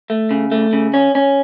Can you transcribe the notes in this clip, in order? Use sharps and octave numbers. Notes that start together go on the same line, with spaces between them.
A3
C#3
A3
C#3
C#4
C#4